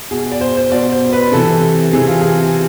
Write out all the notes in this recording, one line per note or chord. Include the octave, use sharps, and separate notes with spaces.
B2 G#4
D5
C5
C5
B2 D5
C5
B4
C3 E3 A4
C3 E3 G#4
F4
G#4